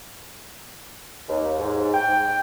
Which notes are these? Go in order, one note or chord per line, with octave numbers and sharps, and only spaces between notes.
D#2
G#2
G5